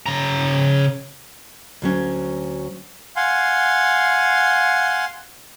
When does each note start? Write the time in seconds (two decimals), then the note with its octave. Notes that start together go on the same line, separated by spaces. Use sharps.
0.06 C#3 A#5
1.82 D2 F#3 C#4
3.16 F5 F#5 G#5 C6